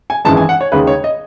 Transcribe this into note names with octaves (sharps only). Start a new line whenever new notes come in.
G#5
G#1 F#2 E3 G#3 A5
G#5
F#5
C#5
D#2 C#3 G#3 B4
C#5
D#5